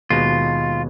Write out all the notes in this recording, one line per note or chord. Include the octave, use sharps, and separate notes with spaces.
D#2 B2 G#3 F4